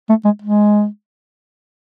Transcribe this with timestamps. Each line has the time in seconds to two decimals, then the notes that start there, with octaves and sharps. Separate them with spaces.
0.09 A3
0.25 G#3
0.42 G#3